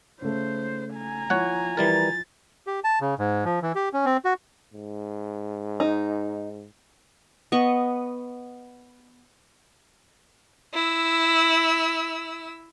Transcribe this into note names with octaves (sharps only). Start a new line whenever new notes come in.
C#3 A3 C5
G#5 A#5
F3 E4 C#5 F#5
E3 G3 A#4 A6
G4
A5
C#3
G#2
F3
E3
G4
C#4
C4
F#4
G#2
D#4
B3 D#5 C#6
E4 E6